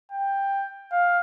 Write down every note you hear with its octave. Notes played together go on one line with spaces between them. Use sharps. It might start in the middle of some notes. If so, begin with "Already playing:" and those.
G5
F5